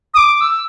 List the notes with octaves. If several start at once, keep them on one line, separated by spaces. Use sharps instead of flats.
D#6
D6
E6